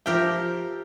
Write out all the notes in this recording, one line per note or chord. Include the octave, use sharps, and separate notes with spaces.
F3 G4 A#4 E5 G5